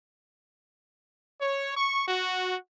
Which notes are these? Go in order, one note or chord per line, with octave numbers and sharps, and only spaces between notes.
C#5
C#6
F#4